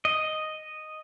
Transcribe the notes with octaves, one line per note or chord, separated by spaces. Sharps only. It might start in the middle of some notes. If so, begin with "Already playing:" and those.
D#5